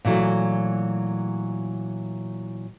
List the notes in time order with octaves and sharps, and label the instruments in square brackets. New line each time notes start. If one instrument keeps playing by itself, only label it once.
[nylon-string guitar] A#2 E3 F#3 A3